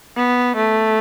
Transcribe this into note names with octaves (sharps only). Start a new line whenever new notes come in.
B3
A3